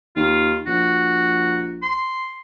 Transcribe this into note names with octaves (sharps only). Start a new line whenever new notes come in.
D#2 F4
A#1 F#4
C6